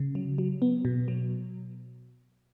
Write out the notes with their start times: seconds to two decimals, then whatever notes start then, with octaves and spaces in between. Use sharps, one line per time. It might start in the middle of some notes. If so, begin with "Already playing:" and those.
Already playing: C#3
0.15 F#3
0.38 F#3
0.62 B3
0.85 B2
1.08 F#3